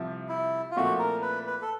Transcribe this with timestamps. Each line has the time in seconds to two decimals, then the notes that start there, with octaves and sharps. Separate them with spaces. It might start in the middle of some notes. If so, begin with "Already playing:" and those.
Already playing: C2 C3 F3
0.29 E4
0.71 F4
0.76 A#2 F3 A3 C4 E4 F#4
0.99 A#4
1.22 B4
1.47 B4
1.62 A4